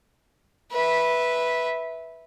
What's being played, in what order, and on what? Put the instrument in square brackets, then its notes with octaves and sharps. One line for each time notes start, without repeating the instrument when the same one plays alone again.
[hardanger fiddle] B4 E5